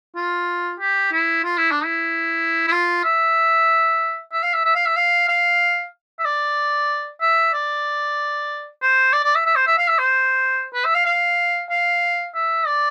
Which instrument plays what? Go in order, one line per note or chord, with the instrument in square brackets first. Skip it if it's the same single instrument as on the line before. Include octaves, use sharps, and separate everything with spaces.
[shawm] F4
G4
E4
F4
E4
D4
E4
E4
F4
E5
E5
F5
E5
E5
F5
E5
F5
F5
E5
D5
E5
D5
C5
D5
D5
E5
E5
C5
E5
F5
E5
C5
B4
E5
F5
F5
F5
E5
D5